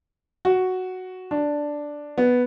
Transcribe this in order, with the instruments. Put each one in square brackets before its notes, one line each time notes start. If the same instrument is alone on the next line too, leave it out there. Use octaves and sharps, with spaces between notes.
[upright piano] F#4
D4
B3